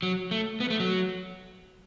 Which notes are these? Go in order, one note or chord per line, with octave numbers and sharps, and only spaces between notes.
F#3
A3
B3
A3
F#3